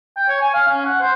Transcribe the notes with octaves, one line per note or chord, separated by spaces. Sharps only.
G5
C#5
G#5
F5
C#4
F#5
C5